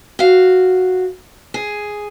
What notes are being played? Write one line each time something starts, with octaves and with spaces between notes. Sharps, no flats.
F#4 F5
G#4